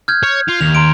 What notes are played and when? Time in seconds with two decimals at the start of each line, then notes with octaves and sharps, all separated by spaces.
0.08 F6 G6 G#6
0.23 C#5
0.48 F4
0.61 D#2 F7
0.75 A#5 C6 D7